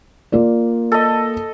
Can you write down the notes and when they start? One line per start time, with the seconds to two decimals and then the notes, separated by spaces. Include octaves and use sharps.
0.32 A#3 F4 D5
0.92 A4 D#5